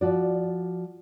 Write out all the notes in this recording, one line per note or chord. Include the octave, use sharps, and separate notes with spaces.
F3 F#4 D5